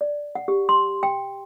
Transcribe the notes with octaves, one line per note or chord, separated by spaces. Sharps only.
D5
F#5
G4
C6
G5